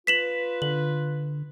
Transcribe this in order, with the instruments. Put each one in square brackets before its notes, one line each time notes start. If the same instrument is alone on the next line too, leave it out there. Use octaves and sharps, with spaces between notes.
[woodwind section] F4 B4 [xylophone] B6 E7 F#7
[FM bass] D3 [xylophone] F#7